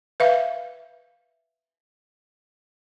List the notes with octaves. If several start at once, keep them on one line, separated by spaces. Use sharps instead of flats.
B4 E5 F5